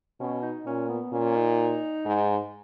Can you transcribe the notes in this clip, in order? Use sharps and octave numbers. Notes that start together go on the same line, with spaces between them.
B2 C#4
D#4
A#2 C#4
B3
A#2 C#4
D#4
G#2